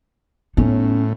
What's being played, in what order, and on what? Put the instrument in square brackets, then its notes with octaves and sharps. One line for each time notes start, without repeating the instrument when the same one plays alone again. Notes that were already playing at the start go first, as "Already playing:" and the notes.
[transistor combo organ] A2 [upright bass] B3 D#4 [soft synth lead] C#4